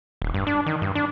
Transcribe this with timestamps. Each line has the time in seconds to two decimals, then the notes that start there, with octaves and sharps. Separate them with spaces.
0.22 D#1
0.34 G2
0.47 D4
0.66 D#3
0.82 G2
0.95 D4